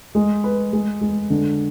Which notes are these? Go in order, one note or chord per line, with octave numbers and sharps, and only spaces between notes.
G#3
B4
G#3
G#3
D3